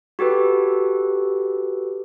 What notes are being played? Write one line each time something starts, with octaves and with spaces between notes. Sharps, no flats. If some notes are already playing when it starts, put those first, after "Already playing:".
F#4 G4 A4 B4